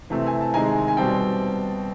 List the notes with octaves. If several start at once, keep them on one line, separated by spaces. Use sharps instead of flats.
C3 E3 A3 C4
G#5
A5
C3 D#3 G#3 C4 G#5 A#5
G#5
B2 G3 C4 G5 A5